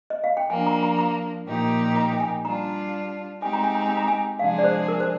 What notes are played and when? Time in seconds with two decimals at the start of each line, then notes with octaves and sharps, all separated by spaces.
0.10 D#5
0.24 F5
0.37 G5
0.50 F3 A#3 D4 G#5
0.67 A#5
0.83 A#5
0.99 A#5
1.47 A#2 F3 A#3 D#4 G4
1.96 A#5
2.13 G5
2.20 G#5
2.45 G3 D4 F4 A#5
3.42 G#3 C4 D#4 G4 G#5
3.53 A#5
3.64 G#5
3.75 A#5
3.86 G#5
3.97 A#5
4.08 G#5
4.39 C3 F3 G#3 D4 G#4 F5
4.59 D5
4.64 C5
4.88 A#4
5.00 C5